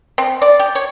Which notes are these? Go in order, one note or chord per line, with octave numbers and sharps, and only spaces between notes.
C4
D5
G4
C#5